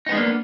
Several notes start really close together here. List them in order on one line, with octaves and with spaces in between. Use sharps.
D#4 B3 G#3 D4 A#3